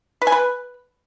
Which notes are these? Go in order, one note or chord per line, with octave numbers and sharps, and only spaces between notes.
B4
G#5
B4